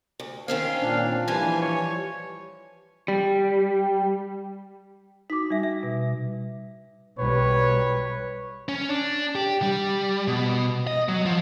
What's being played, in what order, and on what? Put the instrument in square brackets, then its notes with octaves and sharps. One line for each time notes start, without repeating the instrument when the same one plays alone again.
[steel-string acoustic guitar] D2
[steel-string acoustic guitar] D#3 C4 C#4 [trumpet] F5
[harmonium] A#2 D4
[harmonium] E3 [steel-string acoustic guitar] F3 G3 [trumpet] G#5
[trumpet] C#5
[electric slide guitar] G3
[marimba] D#4 F#4 D6 [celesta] B6
[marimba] G3 [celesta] D#4 E5
[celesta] E5
[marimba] B2
[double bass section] B1 G3 [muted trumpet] B4 [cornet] C#5
[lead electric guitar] C#4
D4
G4
G3
B2
D#5
F#3
F3